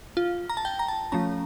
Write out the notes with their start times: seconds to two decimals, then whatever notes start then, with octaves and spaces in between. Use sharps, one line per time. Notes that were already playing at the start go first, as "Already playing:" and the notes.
0.17 F4
0.49 A#5
0.57 A5
0.65 G5
0.79 A#5
0.88 A5
1.12 F3 A3 C#4 A#5